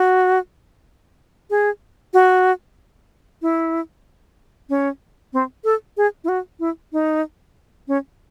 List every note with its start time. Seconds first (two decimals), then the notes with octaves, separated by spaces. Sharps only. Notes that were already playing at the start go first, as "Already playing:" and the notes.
Already playing: F#4
1.50 G#4
2.14 F#4
3.42 E4
4.69 C#4
5.33 C4
5.64 A4
5.97 G#4
6.24 E4
6.29 F#4
6.60 E4
6.93 D#4
7.88 C#4